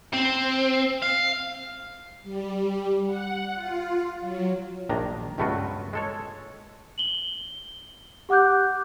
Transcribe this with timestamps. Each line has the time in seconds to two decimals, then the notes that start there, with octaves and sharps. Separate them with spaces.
0.13 C4
1.02 F5
2.23 G3
3.06 F#5
3.55 F4
4.20 F#3
4.89 A#1 D#3 D4 A#5
5.38 C#2 G2 A3 B3 F4 F#4
5.93 G#3 A4 C#5
6.98 F#7 G7
8.29 G4 F#5 D6 F#6 G6